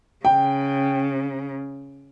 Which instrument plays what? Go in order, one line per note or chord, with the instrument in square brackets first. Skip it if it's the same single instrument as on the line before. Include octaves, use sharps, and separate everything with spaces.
[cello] C#3 [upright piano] G5